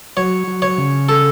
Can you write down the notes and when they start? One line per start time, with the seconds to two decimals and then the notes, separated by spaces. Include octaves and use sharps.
0.17 F#3 C#5
0.47 F#3
0.62 C#5
0.78 C#3
1.09 A4